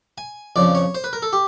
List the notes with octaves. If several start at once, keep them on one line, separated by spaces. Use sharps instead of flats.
G#5
F2 C#3 F3 D5
C#5
C5
B4
A#4
A4
G4